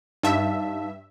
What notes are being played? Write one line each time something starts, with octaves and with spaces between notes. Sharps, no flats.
G2 D#4 E5 F5 A5